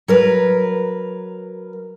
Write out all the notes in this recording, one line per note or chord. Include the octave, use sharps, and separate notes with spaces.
F#3 A#4 B4